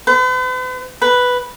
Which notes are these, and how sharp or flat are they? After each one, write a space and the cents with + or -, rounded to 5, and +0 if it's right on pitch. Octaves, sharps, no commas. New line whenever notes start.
B4 +45
B4 +0